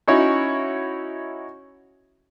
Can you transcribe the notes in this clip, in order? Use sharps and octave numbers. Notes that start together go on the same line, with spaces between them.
C#4 D#4 E4 F#4 C#5